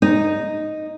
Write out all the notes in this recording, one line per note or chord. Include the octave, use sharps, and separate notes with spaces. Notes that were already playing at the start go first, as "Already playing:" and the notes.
D#4